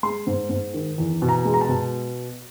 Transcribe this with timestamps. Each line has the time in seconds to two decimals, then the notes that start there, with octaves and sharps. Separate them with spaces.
0.03 G#3 C6
0.27 G#2
0.50 G#2
0.74 D#3
0.98 E2
1.22 B2
1.29 A#5
1.45 G#3
1.54 A#5
1.61 A5
1.69 B2